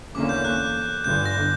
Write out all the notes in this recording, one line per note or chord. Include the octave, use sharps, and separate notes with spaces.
E2 D3 A#3 C#4 D6
G6
F#6
G1 G2 D3 G6
A#6